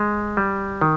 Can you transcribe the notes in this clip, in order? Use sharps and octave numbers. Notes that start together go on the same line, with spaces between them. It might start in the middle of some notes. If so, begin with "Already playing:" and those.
Already playing: G#3
G3
D#3